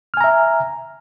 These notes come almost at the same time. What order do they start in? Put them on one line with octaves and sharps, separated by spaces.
F6 G#5 A#5 E5